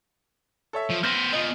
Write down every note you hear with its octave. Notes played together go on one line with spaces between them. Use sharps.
A4 C#5 E5
F3
B3 C5 F6 G6 A#6
B3 F4 D#5